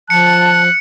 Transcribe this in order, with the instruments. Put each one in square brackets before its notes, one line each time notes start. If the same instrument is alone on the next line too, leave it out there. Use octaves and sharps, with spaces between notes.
[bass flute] F3 [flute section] A5 [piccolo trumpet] F#6 [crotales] C#7